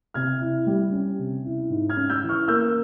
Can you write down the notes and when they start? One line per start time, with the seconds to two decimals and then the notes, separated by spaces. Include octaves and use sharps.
0.14 C3 F6 G#6
0.41 E4
0.67 G3
0.92 C#4
1.19 C3
1.45 E4
1.70 G#2
1.90 F6 G#6
1.97 C#4
2.10 E6 G6
2.23 E3
2.29 C#6 F6
2.48 A#3 E6 G6